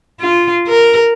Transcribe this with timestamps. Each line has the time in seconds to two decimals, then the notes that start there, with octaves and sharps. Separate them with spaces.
0.21 F4
0.67 A#4